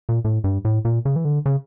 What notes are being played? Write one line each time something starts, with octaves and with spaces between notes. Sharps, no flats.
A#2
A2
G2
A2
A#2
C#3
E3
D3
C#3